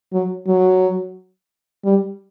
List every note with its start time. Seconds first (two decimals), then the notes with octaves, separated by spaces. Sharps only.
0.12 F#3
0.47 F#3
1.84 G3